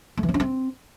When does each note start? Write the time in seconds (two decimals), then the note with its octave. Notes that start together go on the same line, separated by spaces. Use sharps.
0.17 A3
0.23 E3
0.29 C4
0.34 C#4
0.40 C4